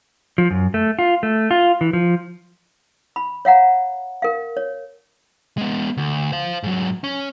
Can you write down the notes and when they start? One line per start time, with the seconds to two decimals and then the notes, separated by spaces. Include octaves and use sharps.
0.38 F3
0.51 F#2
0.74 A3
0.99 F4
1.23 A3
1.51 F4
1.81 E3
1.93 F3
3.16 B5
3.45 C#5 F5 F#5 A#5
4.22 A#4 F5
4.57 C#5
5.58 G#3 B3
5.97 D2
6.32 C5 F5
6.63 G#2 F#3
7.04 C#4